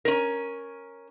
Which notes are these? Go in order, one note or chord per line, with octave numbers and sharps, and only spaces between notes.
C#4 A#4